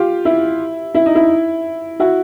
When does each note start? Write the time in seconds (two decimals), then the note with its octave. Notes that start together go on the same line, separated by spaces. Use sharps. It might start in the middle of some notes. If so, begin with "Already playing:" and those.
Already playing: F4 G4
0.25 E4
0.95 E4
1.06 D#4
1.15 E4
2.00 E4 F#4